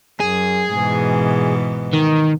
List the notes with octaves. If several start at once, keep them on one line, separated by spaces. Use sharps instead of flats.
F#2 G#4
G#2 B2 E3
D#3